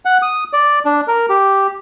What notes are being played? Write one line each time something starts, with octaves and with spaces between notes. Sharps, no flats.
F#5
D#6
D5
D4
A#4
G4